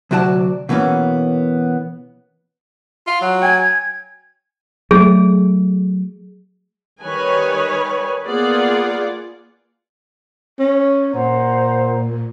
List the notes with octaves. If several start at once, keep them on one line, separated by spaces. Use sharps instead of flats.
D2 C3 F#3 F#4 D5 A5
B2 E3 A#3 B3 C#4
F4
F#3
G5 G#5 G#6
F#3 A3 G#4
D#3 G3 B4 C#5 G#5
A#3 B3 F4 G#4 D5 F#5
C#4
A#2 C5 F#5 A#5